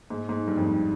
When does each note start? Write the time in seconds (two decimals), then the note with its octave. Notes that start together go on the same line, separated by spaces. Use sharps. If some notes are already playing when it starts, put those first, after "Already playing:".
0.10 G#2
0.29 G#2
0.48 G2
0.57 F2
0.67 G2